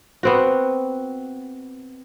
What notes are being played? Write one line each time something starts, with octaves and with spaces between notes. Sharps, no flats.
B3 C4 F#4